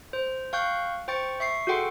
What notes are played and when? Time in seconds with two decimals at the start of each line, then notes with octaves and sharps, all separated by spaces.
0.13 C5
0.53 F5 G5 C#6 F#6 G6
1.08 C5 G5 C#6 A6 C#7
1.40 E5 C#6 C7
1.67 F#4 G#4 A4 F#5 G5 C6